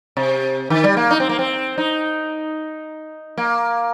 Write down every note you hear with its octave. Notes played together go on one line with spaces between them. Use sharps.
C3
D#3
G3
A#3
D#4
C4
A#3
C4
D#4
A#3